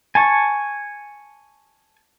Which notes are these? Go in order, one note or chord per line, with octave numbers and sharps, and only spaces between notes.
G#5 A5 C#6